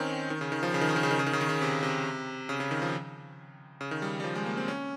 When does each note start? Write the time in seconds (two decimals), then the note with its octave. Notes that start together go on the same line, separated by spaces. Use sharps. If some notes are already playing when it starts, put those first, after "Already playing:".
Already playing: D#3 C4 C#4 D#4
0.30 D#3
0.41 C#3
0.52 D#3
0.63 F3
0.74 C#3
0.81 D#3
0.89 C#3
0.96 D#3
1.03 C#3
1.11 D#3
1.19 C#3
1.26 D#3
1.33 C#3
1.41 D#3
1.49 C#3
1.61 C3
1.83 C3
2.49 C#3
2.60 C#3
2.71 D#3
2.82 F3
3.81 C#3
3.91 D#3
4.02 G3
4.20 G3
4.24 F3
4.35 G#3
4.46 A#3
4.57 C4
4.68 C#4